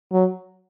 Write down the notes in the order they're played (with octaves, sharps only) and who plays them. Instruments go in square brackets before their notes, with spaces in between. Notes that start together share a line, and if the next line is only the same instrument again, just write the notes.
[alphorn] F#3